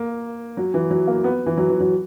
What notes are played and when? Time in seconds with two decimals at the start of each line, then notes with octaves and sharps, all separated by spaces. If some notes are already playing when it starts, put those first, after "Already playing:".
Already playing: A#3
0.57 F#3
0.74 E3
0.91 F#3
1.07 A#3
1.24 B3
1.46 E3
1.58 F#3
1.69 E3
1.80 F#3